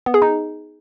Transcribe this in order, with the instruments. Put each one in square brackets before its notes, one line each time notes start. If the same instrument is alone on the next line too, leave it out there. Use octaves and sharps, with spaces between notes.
[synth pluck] B3
G#4
D#4